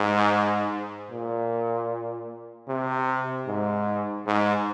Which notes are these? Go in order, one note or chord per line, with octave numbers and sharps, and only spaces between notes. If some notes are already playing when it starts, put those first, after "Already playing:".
Already playing: G#2
A#2
C3
G#2
G#2